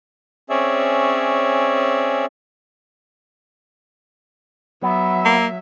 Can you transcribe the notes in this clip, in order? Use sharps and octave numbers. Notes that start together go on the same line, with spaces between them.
C4 C#4 G#4 C#5 D5 E5
F#3 B3 E5
A#3